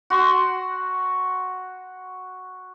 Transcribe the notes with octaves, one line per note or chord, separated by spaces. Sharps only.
F#4 C6